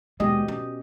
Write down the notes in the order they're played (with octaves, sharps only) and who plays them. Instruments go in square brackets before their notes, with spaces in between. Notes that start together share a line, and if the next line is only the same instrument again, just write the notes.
[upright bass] D#2 G#3 [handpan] B2 G4 D#5
[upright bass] C#4